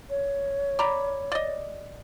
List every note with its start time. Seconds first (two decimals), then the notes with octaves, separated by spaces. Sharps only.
0.10 C#5
0.79 D5 A#5 B5
1.32 D5 D#5